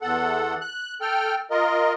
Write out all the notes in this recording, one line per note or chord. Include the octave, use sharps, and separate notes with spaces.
E2 A4 F#5
F#6
A4 G5 F6
F4 A#4 D#5